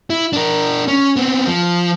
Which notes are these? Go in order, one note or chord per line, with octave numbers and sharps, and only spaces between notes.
E4
D4 A#4
C#4
B3 C4
F3